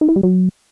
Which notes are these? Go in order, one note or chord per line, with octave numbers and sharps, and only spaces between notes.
D#4
E4
G3
F#3